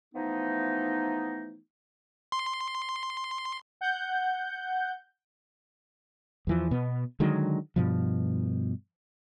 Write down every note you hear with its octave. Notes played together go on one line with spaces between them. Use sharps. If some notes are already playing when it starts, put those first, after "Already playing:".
E3 F3 A3 B3 D#4
C6
F#5 G6
E2 E3 F3
B2 B3
D3 D#3 F#3 G#3
G2 B2 F3